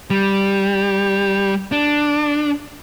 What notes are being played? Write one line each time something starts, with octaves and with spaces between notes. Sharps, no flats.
G3
D4